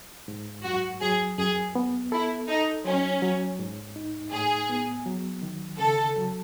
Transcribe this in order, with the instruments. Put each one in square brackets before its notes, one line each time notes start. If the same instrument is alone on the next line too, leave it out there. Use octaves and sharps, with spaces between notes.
[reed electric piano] G#2
[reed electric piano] F#2 [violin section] F#4
[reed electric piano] F#3 [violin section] G#4
[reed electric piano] F#2 [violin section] G#4
[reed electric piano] B3
[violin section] E4 [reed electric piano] A4
[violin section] D#4 [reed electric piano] A4
[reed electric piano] F#3 [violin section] C#4
[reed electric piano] F#3
G#2
D#4
[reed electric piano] A2 [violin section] G#4
[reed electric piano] B3
F#3
D#3
[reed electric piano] C#3 [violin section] A4
[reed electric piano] F#3